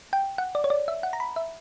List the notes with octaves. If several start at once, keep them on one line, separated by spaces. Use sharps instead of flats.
G5
F#5
D5
C#5
D5
E5
F#5
A#5
B5
E5